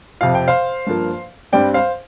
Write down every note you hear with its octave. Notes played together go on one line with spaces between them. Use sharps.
F2 C3 F3 F5
G5
C5 F5
G2 F3 A#3
G2 G3 C4 D5 G5
C5 F5